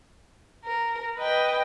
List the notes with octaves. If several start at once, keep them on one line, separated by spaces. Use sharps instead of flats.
A#4
B4 D#5 G5